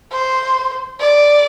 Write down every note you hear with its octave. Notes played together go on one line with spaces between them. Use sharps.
C5
D5